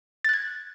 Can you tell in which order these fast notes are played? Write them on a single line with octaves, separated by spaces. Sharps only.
A6 F#6 G#6